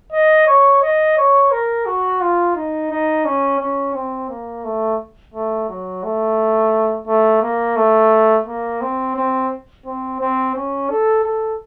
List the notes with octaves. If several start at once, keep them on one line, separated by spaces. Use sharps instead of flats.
D#5
C#5
D#5
C#5
A#4
F#4
F4
D#4
D#4
C#4
C#4
C4
A#3
A3
A3
F#3
A3
A3
A#3
A3
A#3
C4
C4
C4
C4
C#4
A4
A4